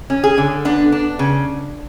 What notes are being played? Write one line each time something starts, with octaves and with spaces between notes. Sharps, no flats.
C#4
G#4
D3
B3 D4
D4
C#3